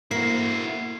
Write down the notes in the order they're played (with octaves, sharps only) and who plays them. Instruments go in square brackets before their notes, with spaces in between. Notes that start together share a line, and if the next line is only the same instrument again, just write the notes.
[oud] A#3 [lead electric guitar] E4 F#4 [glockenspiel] C7